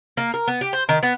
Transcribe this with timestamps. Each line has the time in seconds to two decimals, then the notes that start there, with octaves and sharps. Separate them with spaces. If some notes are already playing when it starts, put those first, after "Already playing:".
0.17 A#3
0.34 A#4
0.48 B3
0.61 G4
0.73 C5
0.89 D#3
1.03 B3